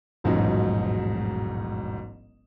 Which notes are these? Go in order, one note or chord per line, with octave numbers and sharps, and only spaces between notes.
E1 A1 G#2 F3 F#3 D#4